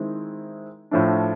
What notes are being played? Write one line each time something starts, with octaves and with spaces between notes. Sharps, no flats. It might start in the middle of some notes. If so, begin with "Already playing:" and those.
Already playing: D#3 G#3 C4 E4
A2 F3 A3 D4